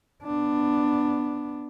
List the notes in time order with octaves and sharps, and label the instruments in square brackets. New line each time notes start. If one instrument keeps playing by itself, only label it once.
[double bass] B3 D4